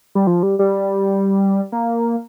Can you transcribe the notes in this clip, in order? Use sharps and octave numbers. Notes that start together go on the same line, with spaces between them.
G3
F3
G3
G3
A#3